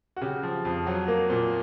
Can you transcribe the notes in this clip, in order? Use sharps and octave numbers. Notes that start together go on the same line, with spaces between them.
F#4
C#3 G4
F3
F2
F#3
A#3
A#2